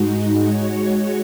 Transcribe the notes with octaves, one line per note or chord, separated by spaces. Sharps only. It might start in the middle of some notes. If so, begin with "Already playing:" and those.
Already playing: G#2 G#3 D#4 F#4
G#3 F#4 C#5